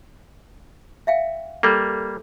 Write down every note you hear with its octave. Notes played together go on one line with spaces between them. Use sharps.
E5 F5 G5
G3 A#3 A4